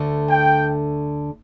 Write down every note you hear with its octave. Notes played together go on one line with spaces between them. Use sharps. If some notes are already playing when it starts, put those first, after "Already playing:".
Already playing: D2 D3 A3
G5